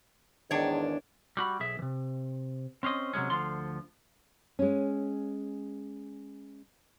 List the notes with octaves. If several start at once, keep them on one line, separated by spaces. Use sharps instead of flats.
E2 G#2 D#3 D4 C#5
G3 F#4 B5
B1 G#4 E5
C3 E3
C4 C#4 C5 D#5
C3 F#3 G#3 C#4
D2 D3 F3 F4 C6
G#3 C#4